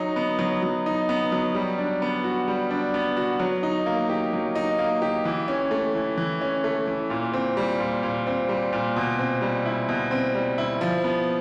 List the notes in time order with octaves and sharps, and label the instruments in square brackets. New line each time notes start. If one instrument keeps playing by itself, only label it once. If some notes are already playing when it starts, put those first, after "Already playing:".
Already playing: [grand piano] F#3 D#4
B3
F#3
F#3
D#4
B3
F#3
G3
D4
B3
F#4
G3
D4
B3
F#4
F#3
D#4
A#3
G4
F#3
D#4
A#3
G4
E3
C#4
A3
E3
E3
C#4
A3
E3
A#2
C4
G3
A#2
A#2
C4
G3
A#2
B2
C4
G3
E4
B2
C4
G3
E4
F3
B3